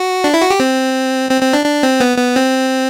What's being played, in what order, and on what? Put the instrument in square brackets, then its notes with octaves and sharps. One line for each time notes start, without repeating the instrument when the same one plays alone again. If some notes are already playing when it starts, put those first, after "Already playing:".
Already playing: [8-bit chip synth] F#4
D4
E4
F#4
G4
C4
C4
C4
D4
D4
C4
B3
B3
C4